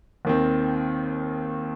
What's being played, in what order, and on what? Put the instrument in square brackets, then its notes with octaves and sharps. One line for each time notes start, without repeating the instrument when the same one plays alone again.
[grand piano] D#2 D#3 C4